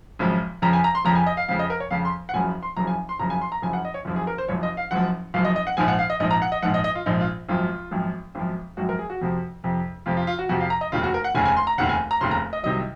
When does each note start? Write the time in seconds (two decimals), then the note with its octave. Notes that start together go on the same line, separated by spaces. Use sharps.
0.19 G#1 F#2 C#3 F3
0.62 F2 C#3 F3 A#5
0.73 G#5
0.84 A#5
0.95 C6
1.05 F2 C#3 F3 A#5
1.15 G#5
1.26 D#5
1.37 F5
1.48 F2 C#3 F3 F5
1.59 D#5
1.70 A#4
1.80 C#5
1.90 F2 C#3 F3 F5
2.05 C6
2.29 F#5
2.34 F#1 F#2 C#3 F3 G#5
2.63 C6
2.77 F#1 F#2 C#3 F3 A#5
2.87 G#5
3.09 C6
3.19 F#1 F#2 C#3 F3 A#5
3.30 G#5
3.41 C6
3.52 A#5
3.62 F#1 F#2 C#3 F3 G#5
3.73 F#5
3.85 D#5
3.94 C#5
4.05 F#1 F#2 F3
4.16 G#4
4.27 A#4
4.38 C5
4.48 F#1 F#2 F3 C#5
4.63 D#5
4.77 F5
4.91 F#1 F#2 F3 F#5
5.34 F#1 F#2 F3 F5
5.45 D#5
5.56 D#5
5.67 F#5
5.77 A#1 G#2 F3 G#5
5.88 F#5
5.99 F5
6.10 D#5
6.20 A#1 G#2 F3 D#5
6.31 A#5
6.42 F#5
6.52 D#5
6.62 A#1 G#2 F3 F#5
6.74 D#5
6.84 D#5
6.95 F4
7.06 A#1 G#2 F3 D#4
7.21 F4
7.49 G#1 F#2 F3 F4
7.91 G#1 F#2 F3
8.35 G#1 F#2 F3
8.77 G#1 F#2 F3 F#4
8.89 A#4
8.99 G#4
9.10 F#4
9.21 F2 C3 F3
9.64 F2 C3 F3
10.06 F2 C3 F3 F4
10.17 F4
10.27 F4
10.39 F#4
10.49 F2 C3 F3 F#4
10.60 F5
10.70 A#5
10.81 D#5
10.92 F1 D#2 C#3 F4
11.03 F#4
11.14 A#4
11.24 F#5
11.35 F1 D#2 C#3 G#5
11.46 G#5
11.57 C6
11.67 A#5
11.78 F1 D#2 C#3 F#5
11.89 G#5
12.11 A#5
12.21 F1 D#2 C#3 C6
12.31 A#5
12.53 D#5
12.63 C2 C3 D#3 F#3 D#5